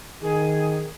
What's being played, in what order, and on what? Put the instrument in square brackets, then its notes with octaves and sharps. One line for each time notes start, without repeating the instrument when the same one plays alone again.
[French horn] D#3 [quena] G#4